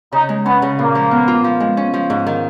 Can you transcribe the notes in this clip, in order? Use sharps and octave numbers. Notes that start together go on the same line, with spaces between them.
C#3 D#4
G#3
B3 C#4
C#3
A#2 A#3
F3
B3
F4
F3
G#3
C#4
F3
G#2
D#3